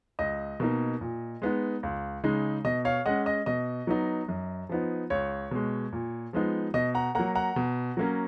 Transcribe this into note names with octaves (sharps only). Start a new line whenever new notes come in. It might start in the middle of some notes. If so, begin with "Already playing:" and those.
C#2 D#5
B2 A#3 D#4
A#2
G#3 B3 D#4
C#2
C#3 G#3 D#4
B2 D#5
C#5 F5
G#3 C#4 D#5 F#5
D#5
B2 D#5
F#3 B3 D#4
F#2
F3 B3 D#4
C#2 C#5
B2 G#3
A#2
F3 G#3 B3 D#4
B2 D#5
F#5 A#5
F#3 A#3 F#5 A#5
F#5 A#5
B2
F#3 A#3 C#4